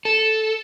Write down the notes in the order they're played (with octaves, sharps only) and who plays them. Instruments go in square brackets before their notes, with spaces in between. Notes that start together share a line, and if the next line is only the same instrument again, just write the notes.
[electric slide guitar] A4